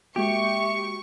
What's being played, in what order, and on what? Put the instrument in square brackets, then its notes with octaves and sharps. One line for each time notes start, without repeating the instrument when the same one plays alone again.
[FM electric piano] G#3 A#3 F#4 [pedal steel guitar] G4 [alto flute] E5 [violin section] C#6